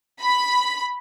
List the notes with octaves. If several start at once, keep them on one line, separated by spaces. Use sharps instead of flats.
B5